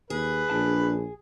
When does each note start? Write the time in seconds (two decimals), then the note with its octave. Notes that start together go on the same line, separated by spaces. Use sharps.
0.10 D#2 G#4 B4
0.50 A#1 D4 A5